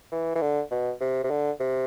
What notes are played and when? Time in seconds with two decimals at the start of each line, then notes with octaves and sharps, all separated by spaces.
0.12 E3
0.35 E3
0.41 D3
0.71 B2
1.01 C3
1.24 C3
1.30 D3
1.60 C3